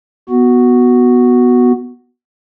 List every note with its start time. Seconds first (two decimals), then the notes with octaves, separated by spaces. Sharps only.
0.29 B3 F#4